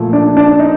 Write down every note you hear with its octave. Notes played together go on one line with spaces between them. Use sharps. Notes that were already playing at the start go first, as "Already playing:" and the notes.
Already playing: A#2 F3 A3
D4
D4
D#4